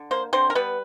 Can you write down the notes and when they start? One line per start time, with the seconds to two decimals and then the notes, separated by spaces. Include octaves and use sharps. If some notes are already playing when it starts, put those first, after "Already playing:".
Already playing: D3
0.11 A#3 C5
0.33 D3 C4 C5
0.50 A#4
0.55 G3 B3 B4